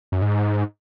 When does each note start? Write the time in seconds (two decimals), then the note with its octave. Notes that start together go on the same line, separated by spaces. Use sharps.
0.12 F#2
0.22 G#2